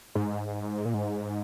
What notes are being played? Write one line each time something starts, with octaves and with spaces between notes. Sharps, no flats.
G#2
A#2
G#2